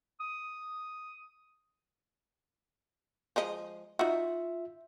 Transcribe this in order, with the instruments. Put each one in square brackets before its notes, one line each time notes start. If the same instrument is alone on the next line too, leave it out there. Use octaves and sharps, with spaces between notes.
[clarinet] D#6
[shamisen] F3 G#3 D#5
[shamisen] D#4 F#4 [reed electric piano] F4 E5